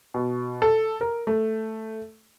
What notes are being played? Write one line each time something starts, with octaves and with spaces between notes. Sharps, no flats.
B2
A4
A#4
A3